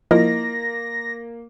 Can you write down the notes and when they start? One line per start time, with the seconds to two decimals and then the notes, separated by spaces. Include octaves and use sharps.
0.11 F3 A#3 E4 A#4 D#5 A#6